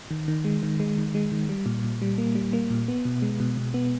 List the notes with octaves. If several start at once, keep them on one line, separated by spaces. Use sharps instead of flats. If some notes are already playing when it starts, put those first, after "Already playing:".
D#3
D#3
G#3
D#3
G#3
D#3
G#3
D#3
G3
A#2
A#2
G3
A#3
G3
A#3
A#2
B3
B2
G#3
B2
B2
B3